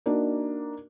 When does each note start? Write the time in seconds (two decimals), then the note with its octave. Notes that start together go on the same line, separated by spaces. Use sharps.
0.06 A#3 D4 D#4 F#4